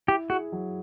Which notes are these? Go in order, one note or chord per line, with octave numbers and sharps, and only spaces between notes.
E4 G4
F#4 G#4
F#3